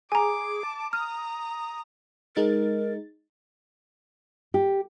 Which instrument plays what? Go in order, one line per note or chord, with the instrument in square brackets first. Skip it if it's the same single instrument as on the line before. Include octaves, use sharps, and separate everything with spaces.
[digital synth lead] G#4 [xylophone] G#5 A#5 [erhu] D6
[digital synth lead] A5
[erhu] A#5 [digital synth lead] D#6 [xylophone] F6
[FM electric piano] G#3 D#4 A6 [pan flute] A#4
[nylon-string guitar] G4